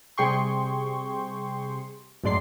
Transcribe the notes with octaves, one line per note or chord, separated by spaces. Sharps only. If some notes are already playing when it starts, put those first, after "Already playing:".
C3 G3 G#4 G5 C6 C#6
F#2 A2 G#3 D5 C6 C7